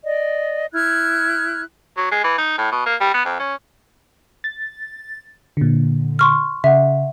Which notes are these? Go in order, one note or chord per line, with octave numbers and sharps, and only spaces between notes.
D5 D#5
E4 F6 F#6 G#6
F#3
G#3
E3
D#4
A2
B2
A#3
G3
B3
F2
C#4
A6
A#2 D3
C6 C#6 F6
C#3 E5 F#5